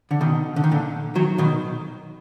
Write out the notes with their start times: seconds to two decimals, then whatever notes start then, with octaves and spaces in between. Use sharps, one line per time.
0.11 D3
0.21 B2 D#3
0.56 D3
0.64 D#3
0.71 A#2 D3
1.15 D#3 F#3
1.38 B2 D#3